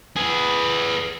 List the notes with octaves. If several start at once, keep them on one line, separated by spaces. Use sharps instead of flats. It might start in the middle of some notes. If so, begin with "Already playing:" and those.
G#4 B4